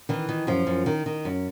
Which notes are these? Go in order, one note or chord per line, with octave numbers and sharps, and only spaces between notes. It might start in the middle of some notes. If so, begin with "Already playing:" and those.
D#3 E3
D#3
F#2 F3
F#2
D#3
D#3
F#2